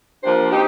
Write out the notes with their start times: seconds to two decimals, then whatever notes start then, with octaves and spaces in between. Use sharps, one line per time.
0.24 F3 A#3 D4 G4 C5
0.51 C4 D#4 G4